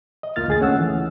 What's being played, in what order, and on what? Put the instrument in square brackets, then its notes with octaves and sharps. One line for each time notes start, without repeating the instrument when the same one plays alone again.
[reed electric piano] D#5
C#2 A#3 F4 F6 A6
D2 G#4 A6
A3 C#4 F#5 E6
E3